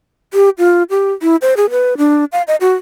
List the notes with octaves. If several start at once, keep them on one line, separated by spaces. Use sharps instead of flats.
G4
F4
G4
E4
C5
G#4
B4
D4
F5
D#5
F#4